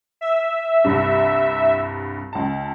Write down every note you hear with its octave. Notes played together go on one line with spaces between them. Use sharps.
E5
C2 G2
C#2 A5